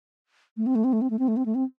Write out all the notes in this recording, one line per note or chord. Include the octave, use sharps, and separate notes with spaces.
A3
C4
A3
C4
A3
C4
A3
C4
A3
C4
A3
C4